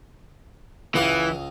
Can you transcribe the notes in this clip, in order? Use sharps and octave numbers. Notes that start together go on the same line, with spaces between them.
C#2 E3 D#5 F5